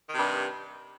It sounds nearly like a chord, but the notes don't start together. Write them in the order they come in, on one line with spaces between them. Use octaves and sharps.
D#3 C3 G2